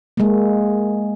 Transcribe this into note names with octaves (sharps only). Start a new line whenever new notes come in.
G#3 A#3